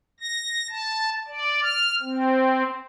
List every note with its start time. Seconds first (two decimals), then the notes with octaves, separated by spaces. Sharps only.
0.20 A#6
0.70 A5
1.28 D5
1.62 F6
2.02 C4